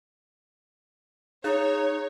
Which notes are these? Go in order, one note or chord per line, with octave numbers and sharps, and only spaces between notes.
D#4 G#4 C#5